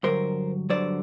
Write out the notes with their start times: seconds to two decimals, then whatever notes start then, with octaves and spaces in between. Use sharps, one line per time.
0.03 G2 D3 F#3 A#4 C5
0.70 G2 D3 F#3 C5 D5